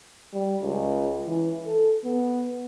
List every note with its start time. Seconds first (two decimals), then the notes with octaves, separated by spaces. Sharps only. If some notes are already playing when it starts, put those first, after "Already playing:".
0.33 G3
0.62 C#2
1.26 E3
1.66 A4
2.04 B3